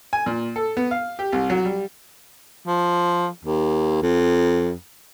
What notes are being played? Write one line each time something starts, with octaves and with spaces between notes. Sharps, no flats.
G#5
A#2
A4
B3
F5
G4
C2
F#3
G3
F3
D#2
F2